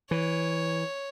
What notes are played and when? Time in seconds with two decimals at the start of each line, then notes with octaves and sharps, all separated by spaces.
0.11 E3 C#5